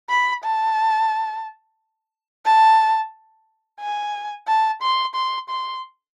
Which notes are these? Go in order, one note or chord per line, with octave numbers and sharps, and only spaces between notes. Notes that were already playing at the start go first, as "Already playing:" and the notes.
B5
A5
A5
G#5
A5
C6
C6
C6